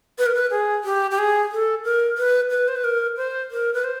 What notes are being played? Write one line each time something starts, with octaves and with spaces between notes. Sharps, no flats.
B4
A#4
B4
G#4
G4
G4
G#4
A4
A#4
B4
B4
C5
B4
A#4
C5
A#4
B4
C5